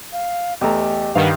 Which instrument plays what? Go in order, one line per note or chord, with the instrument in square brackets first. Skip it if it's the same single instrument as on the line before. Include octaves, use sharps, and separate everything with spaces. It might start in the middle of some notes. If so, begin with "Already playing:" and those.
[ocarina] F5
[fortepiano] E2 A3 A#5 [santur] G4 [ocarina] D#5
[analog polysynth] G2 D#3 [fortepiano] F5 [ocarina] F#5